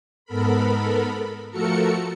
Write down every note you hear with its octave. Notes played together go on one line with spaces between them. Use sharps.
G#2 B3 A4 A#4 B5
F3 A3 F#4 A4 A#4 C#7